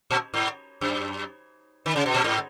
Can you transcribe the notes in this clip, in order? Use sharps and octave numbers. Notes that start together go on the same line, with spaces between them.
A#2
G#2
F#2
D#3
C#3
B2
A#2
G#2